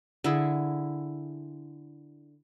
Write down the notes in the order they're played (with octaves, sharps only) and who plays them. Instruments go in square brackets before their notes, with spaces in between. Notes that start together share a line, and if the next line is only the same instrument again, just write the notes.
[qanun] D3 E4 G#4